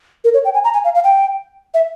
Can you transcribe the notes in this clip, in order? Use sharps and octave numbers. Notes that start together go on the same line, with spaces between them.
A#4
C#5
G5
G#5
A#5
G#5
F5
F5
G5
E5